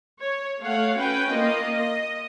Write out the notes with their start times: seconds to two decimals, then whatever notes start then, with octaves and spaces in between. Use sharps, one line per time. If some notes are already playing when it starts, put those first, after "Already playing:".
0.20 C#5
0.60 A3 C#5 F5 F#5
0.98 C#4 F#4 B4 G5
1.31 A#3 F4 D#5
1.75 D#5